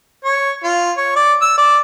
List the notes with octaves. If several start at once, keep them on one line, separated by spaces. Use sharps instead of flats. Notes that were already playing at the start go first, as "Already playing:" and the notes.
C#5
F4
C#5
D5
E6
D5